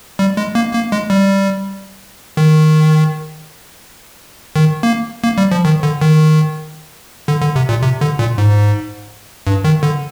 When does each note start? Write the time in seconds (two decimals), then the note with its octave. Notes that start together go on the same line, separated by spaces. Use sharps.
0.19 G3
0.37 G#3
0.55 A#3
0.73 A#3
0.92 G#3
1.10 G3
2.37 D#3
4.56 D#3
4.83 A#3
5.24 A#3
5.38 G3
5.52 F3
5.65 D#3
5.83 D3
6.01 D#3
7.28 D3
7.42 D3
7.56 C3
7.69 A#2
7.83 C3
8.01 D3
8.19 A#2
8.38 G#2
9.47 G2
9.64 D#3
9.83 D3